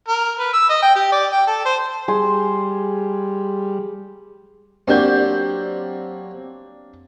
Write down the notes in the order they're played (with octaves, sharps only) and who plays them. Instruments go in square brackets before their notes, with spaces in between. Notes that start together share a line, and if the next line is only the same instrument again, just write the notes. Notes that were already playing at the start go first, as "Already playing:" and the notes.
[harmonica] A#4
B4
E6
D#5
G5
G4
D5
G5
A4
C5
[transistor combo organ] G3 [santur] G#4 [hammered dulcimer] C6
[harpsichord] F#3 G4 C5 [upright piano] A#3 D4 [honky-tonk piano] C4 D5 G6